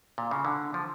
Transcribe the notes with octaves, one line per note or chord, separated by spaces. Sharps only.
A#2
C#3
D3
F3